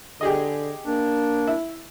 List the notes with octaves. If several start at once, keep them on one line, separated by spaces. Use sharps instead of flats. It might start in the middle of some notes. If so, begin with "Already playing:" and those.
D3 G4 G#4 D#5
A#3 D4
E4